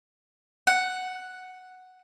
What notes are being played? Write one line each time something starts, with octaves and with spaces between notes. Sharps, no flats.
F#5